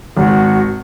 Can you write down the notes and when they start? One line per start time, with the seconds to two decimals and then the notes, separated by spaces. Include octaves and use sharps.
0.17 G#1 F#4